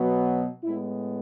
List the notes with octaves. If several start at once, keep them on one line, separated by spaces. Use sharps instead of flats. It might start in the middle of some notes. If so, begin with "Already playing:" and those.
Already playing: B2 F#3 B3
A2 G#3 B3 E4